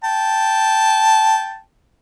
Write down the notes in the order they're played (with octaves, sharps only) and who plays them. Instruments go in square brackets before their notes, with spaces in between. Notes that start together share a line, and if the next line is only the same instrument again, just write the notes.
[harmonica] G5 A5